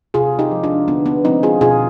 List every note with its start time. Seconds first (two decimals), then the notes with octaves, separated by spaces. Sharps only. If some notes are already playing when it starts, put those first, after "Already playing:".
0.14 C3 F4 G#4
0.39 D#4 G4
0.51 F3 G#3
0.63 D4 F4
0.88 D3 B3 D4
1.06 B3 D4
1.24 F3 G#3 C4 D#4
1.43 F4 G#4
1.61 B2 F4 G#4